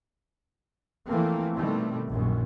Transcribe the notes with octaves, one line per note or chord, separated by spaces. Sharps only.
E3 F3 A3 A#3 C4
B2 D#3 G3 A3 C4
A#1 F#2 A#2 D#3